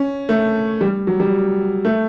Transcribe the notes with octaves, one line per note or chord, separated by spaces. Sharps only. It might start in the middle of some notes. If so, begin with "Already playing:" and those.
Already playing: C#4
A3
G3
F#3
G3
A3